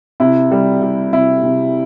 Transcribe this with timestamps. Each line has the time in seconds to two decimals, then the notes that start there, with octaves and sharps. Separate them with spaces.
0.20 C3 E4
0.51 G3
0.82 G3
1.12 C3 E4
1.43 C3